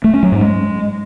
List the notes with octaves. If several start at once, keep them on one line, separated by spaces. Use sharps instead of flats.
A3
C#4
F#3
G#2
G#3